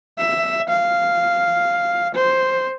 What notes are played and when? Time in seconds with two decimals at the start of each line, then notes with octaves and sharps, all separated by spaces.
0.18 E5
0.69 F5
2.15 C5